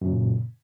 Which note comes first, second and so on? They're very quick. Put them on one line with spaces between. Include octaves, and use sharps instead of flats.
F#2 C#3 A#2